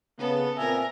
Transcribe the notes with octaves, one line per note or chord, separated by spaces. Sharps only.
C#3 B3 A4
A#2 C4 A#4 E5 G#5